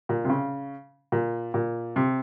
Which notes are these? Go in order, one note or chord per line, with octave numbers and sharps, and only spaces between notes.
A#2
C3
C#3
A#2
A#2
C3